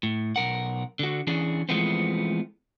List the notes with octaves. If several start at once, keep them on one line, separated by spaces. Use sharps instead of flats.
A2
B1 A#4 F#5
D3 F#4
E3 C#4 D4 G#4
E3 F3 G#3 A3 B3 C4